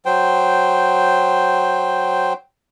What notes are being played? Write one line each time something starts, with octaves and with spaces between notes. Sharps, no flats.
F#3 C5 G5